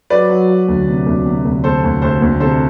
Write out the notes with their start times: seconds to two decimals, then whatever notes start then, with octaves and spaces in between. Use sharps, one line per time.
0.10 F#3 B4 D5
0.30 F#3
0.49 F#3
0.68 D2
0.88 C3
1.07 D2
1.26 C3
1.45 D2
1.64 D2 A4 C5
1.84 D2
2.02 D2 A4 C5
2.22 D2
2.40 C3 A4 C5